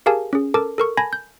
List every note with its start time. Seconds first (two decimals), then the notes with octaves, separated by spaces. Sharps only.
0.06 G4 G#4 A#4 F5 G#5 A5
0.33 C#4 G#4
0.54 A4 A#4 A5 D6
0.78 A4 A#4 C#6
0.97 G#5 A5 B5 G#6 A#6
1.13 G6